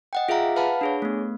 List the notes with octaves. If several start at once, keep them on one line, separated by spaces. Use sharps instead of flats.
D#5 F#5 G5
F4 G#4 E5 F5 A#5
B4 F5 F#5 A5 B5
D4 G#4 C#5
A3 B3